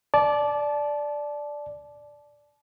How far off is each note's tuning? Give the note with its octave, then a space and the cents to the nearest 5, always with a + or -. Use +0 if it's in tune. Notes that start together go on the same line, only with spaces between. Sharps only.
D5 +0 A5 -25